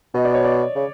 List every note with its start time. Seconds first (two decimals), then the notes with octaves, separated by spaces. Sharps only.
0.14 B2 D#5
0.25 D5
0.35 C#5
0.44 D5
0.76 C#3